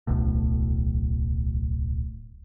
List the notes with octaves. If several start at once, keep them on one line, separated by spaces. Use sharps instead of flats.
D1 B1 A2